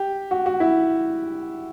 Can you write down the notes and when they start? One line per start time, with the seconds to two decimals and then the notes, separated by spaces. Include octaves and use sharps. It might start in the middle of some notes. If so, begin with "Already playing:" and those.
Already playing: G4
0.31 F#4
0.46 F#4
0.60 E4